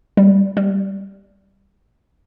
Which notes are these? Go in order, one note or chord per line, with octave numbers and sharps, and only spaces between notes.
G3
G3